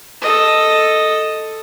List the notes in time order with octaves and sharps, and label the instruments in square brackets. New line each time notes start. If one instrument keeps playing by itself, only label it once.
[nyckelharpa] A4 D#5